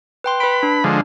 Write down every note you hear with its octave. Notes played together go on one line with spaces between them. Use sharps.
B4 G5 C6
B4 B5 D7
D4
D3 F3 G#3